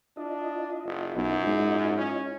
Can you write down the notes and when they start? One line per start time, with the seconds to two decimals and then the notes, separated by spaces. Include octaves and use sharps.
0.17 D4 E4 F4 D#5
0.85 F#1
1.16 B1 F#2
1.46 G#2
1.98 C#4